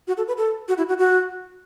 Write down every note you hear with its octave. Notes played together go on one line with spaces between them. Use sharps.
F#4
A4
B4
A4
F#4
E4
F#4
F#4